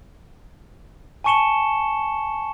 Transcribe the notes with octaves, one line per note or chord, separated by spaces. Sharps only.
G#5 A5 C#6 C#7 E7 G7